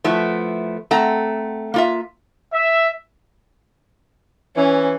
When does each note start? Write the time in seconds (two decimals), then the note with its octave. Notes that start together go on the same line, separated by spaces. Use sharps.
0.04 F3 A3 B3 E4
0.91 A3 C4 F#5 A#5
1.74 A#3 F4 E5
2.53 E5
4.56 E3 C#4